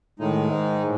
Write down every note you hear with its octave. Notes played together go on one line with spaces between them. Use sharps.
A2 D#3 G#3 D#4
G#2
A2